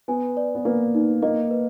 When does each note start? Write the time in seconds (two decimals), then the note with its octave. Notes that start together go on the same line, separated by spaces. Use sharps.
0.08 B3 G#5
0.37 D5
0.55 B3
0.65 A#3 B4
0.95 D#4
1.22 A#3 D#5
1.51 B4